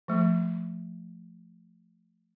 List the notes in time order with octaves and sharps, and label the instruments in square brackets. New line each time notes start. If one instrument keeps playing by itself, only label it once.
[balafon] F3 A3